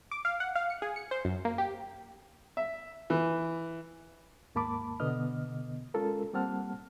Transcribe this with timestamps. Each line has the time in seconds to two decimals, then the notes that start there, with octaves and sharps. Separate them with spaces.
0.11 D6
0.25 F5
0.40 F#5
0.55 F5
0.70 C#7
0.82 G#4
0.96 C#7
1.11 C5
1.25 F#2
1.45 A#3
1.58 G4
2.57 E5
3.10 E3
4.55 D#2 G#2 A#3 A5 B5 D6
5.00 B2 D3 B3 D#5 F6
5.94 G#3 C#4 F4 A4 A#4
6.33 G3 A#3 C4 F#5 A5 F6